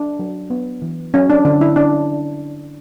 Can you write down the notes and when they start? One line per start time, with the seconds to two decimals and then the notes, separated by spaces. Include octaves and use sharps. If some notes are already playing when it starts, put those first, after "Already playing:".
Already playing: D4
0.19 F#3
0.50 B3
0.82 E3
1.14 F#3 C#4
1.30 D4
1.45 D3 D4
1.61 E4
1.76 C#4 D4